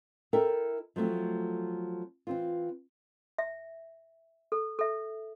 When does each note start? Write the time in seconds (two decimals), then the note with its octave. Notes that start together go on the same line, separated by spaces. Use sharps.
0.33 E4 A4 A#4 E5 G5
0.96 F3 F#3 A3 C4
2.27 E3 C4 F4
3.38 E5
4.52 A4
4.79 A4 E5